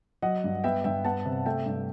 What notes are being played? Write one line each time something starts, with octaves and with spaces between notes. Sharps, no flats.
F#3 D#5 F#5
G2
B3 E5 G5
G2 E5 G5
B3 F#5 A5
C3
A3 E5 G5
G2